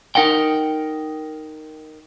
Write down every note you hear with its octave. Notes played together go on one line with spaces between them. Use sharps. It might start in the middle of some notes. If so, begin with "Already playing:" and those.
D#4 A#4 F#5 G5